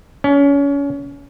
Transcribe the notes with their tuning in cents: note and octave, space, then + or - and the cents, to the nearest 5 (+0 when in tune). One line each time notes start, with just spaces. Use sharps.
C#4 +30